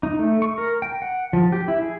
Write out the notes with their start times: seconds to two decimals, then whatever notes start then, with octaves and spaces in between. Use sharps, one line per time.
0.03 D#4
0.19 A3
0.42 C#6
0.58 A#4
0.82 G5
1.02 F#5
1.33 F3
1.52 G4
1.68 E4
1.82 G#4